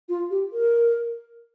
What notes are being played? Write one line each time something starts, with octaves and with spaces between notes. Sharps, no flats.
F4
G4
A#4